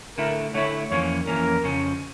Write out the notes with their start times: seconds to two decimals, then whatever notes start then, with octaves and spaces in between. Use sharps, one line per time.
0.18 D3 A3 E4 A#4
0.54 D3 A3 E4 C#5
0.90 F2 E3 A#3 C#4 C#5
1.27 F2 E3 A#3 C#4 A#4
1.63 F2 C#3 F3 C#4